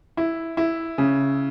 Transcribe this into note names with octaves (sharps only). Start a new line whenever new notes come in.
E4
E4
C#3